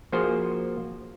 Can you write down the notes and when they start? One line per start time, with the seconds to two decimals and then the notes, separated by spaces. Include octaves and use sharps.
0.12 F3 A#3 F#4 G#4 C5